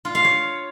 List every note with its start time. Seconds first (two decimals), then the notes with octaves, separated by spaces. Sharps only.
0.05 F4
0.15 F5
0.25 C#5